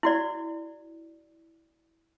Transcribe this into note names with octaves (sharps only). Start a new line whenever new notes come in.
E4 F#4 D5